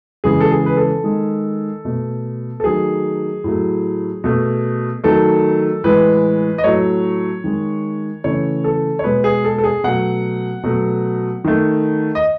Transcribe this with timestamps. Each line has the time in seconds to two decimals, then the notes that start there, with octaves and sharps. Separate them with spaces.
0.24 C#3 E3 G#3 G#4
0.41 A4
0.51 G#4
0.66 B4
0.77 A4
1.04 D#3 G#3
1.85 B2 A3
2.60 A4
2.64 D#3 F#3 A3 G#4
3.44 A2 F#3 A3
4.24 B2 A3
5.04 D#3 F#3 A3 A4
5.84 A2 E3 G#3 B4
6.58 D#5
6.64 A2 F#3 A3 C#5
7.44 D#3 G#3
8.24 C#3 E3 A3 C#5
8.64 A4
8.99 C#5
9.04 B2 G#3 B4
9.24 G#4
9.45 A4
9.58 A4
9.64 G#4
9.84 B2 F#3 A3 F#5
10.63 B2 F#3 A3
11.44 D#3 A3
12.15 D#5